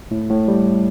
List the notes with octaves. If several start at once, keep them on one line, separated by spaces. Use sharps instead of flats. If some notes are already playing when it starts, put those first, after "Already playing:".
A2
A2
G3